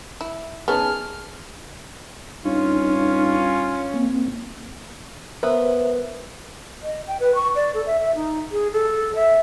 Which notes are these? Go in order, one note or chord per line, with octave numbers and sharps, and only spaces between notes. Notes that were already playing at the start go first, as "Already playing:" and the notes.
E4
B3 C#4 D#4 G#4 A5 F6
G2 C#4 D#4 F4
A#3 C4
B3 A#4 C5 E5
D#5
G5
B4
C#6
D5
A4
E5
E5
D#4
G#4
A4
E5